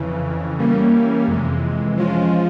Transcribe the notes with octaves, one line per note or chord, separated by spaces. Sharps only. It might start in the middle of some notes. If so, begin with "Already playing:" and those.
Already playing: F2 C#3 E3
E3 G3 A#3 C#4
F2 C3 E3 G#3
F3 G#3 C#4 F4